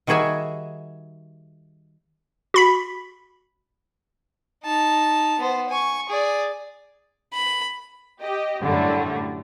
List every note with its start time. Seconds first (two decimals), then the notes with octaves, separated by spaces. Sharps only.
0.07 D#3 G3 F#4 G#4 E5 G#5
2.54 F#4 B5 B6
4.64 D#4 A5
5.39 B3 C5
5.70 G#5 C#6
6.09 G#4 D5
7.34 B5
8.22 G4 D#5
8.64 F#2 A2 D3 G3 A3